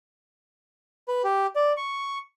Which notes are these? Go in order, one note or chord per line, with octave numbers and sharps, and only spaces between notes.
B4
G4
D5
C#6